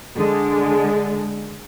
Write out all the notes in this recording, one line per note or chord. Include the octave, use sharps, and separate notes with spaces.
D3 G#3